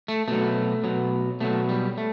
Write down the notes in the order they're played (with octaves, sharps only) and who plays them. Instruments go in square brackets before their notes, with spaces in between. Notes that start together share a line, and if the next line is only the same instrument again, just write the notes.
[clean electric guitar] A3
B2 F#3 A3
B2 F#3
B2 F#3 A3
G3
A3